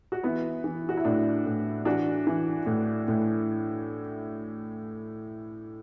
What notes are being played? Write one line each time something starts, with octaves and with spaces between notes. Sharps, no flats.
F#4
E3 B3 E4
E3
F#4
E4
A2 D4
A2
E3 D4 F#4
E3
A2
A2